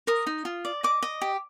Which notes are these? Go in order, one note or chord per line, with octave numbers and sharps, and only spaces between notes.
A#4 D#6
D#4
F4
D5
D#5 D6
D#5
G4